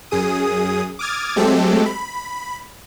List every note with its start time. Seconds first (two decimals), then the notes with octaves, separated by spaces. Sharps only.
0.11 F#2 G#4 D#6
0.99 D6 D#6 F6 G#6 A6
1.36 F#3 G#3 A3 C4 G4 A4
1.86 B5